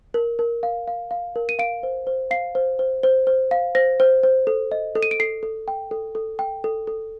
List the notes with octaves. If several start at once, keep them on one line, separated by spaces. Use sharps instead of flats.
A#4
A#4
F5
F5
F5
A#4
D#7
F5 D7
C5
C5
F5 C7
C5
C5
C5
C5
F5
C5 A#6
C5
C5
A4
D#5
A4
D#7
D7
A4 C7
A4
G5
A4
A4
G5
A4
A4